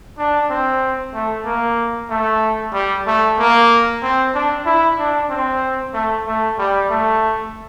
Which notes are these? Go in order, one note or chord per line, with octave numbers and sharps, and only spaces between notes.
D4
C4
A3
A#3
A3
G3
A3
A#3
C4
D4
E4
D4
C4
A3
A3
G3
A3